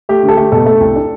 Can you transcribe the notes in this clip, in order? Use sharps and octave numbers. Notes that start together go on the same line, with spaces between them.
A3 G4
D3
A4
A3 G4
B2 A4
A3
C2
D4